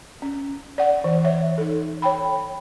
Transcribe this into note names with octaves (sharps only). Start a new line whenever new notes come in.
C#4
D5 F#5
E3
C#5 E5
D#4 A4
C#5 G5 B5